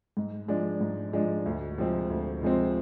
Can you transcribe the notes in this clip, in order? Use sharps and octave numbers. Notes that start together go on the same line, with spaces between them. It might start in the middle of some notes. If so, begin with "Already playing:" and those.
G#2
F3 G#3 D4
G#2
F3 G#3 D4
D2
C3 F3 G#3 C4
D2
C3 F3 G#3 C4